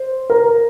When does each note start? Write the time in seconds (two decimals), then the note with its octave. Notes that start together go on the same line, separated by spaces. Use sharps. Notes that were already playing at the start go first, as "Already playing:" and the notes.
Already playing: C5
0.30 A#4